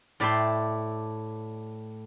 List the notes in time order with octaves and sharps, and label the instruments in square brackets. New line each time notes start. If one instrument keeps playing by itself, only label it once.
[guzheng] A2 D5 E5 G5 A5 C6